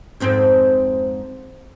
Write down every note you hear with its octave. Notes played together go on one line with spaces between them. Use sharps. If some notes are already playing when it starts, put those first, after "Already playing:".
F2 G#2 C4